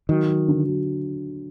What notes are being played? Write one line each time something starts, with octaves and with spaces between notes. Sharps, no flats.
D#3 F#3
F#3
D3
F#3